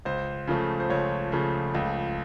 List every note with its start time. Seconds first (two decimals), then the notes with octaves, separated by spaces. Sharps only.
0.05 C#2 C5
0.47 C#3 F3 A3
0.80 C5
0.90 C#2 C#5
1.32 C#3 F3 A3
1.75 C#2